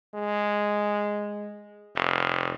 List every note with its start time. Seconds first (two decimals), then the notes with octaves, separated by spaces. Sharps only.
0.14 G#3
1.96 F1